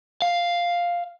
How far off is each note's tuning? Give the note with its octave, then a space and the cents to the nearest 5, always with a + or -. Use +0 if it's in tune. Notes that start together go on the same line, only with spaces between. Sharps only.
F5 +0